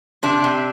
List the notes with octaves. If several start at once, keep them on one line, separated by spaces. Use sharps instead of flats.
C3 D4
C3